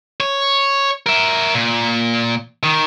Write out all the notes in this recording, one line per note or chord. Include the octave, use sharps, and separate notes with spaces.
C#5
A#4 E5
A#2
D#3